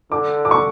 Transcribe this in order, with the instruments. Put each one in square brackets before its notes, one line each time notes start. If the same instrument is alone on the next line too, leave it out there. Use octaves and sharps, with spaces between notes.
[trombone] D3 [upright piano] D6
[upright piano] D6
C#6